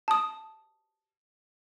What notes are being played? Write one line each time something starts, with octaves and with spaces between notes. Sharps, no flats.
A5 D#6